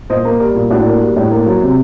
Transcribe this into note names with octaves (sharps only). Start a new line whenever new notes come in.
A#2 C5 D#5
A#3
G3 A#4 D5
A#2
A2 D4 F#4
A#3
G3
A2
A#3
F#3
C3